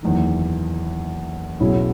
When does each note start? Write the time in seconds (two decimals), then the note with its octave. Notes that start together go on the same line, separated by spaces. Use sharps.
0.03 F#1 E2 D#3
1.60 B1 B2 G#3 C#4 E4